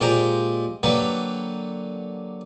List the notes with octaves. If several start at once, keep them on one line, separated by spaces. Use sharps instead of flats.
A#2 G#3 G4 C5 G5 A#5
D3 F#3 A#3 G4 B4